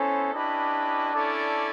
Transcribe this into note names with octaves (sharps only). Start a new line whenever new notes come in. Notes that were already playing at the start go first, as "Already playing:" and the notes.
Already playing: B3 C#4 E4 A4 C5
C#4 D4 E4 G4 B4 D#5
C#4 E4 A4 D5